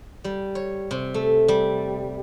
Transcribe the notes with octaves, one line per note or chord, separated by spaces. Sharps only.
G3
C#5
C3
A3
G3